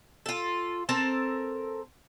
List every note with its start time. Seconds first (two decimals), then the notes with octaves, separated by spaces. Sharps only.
0.26 F4 A4
0.89 C4 A4 A#4 A5